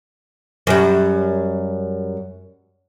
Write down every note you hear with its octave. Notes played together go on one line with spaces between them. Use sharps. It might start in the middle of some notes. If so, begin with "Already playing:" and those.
F#2 G3